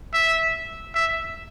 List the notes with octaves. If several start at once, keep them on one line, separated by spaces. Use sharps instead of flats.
E5
E5